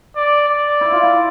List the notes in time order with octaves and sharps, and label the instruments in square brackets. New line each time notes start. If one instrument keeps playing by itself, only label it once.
[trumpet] D5
D5
[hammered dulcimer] E4
F4
E4